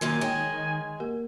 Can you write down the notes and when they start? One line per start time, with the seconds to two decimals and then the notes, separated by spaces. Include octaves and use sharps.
0.01 F#2 A#2 D#3 F3 G#5
0.21 G#3 C#5 G5
1.00 A#3 G4 A#4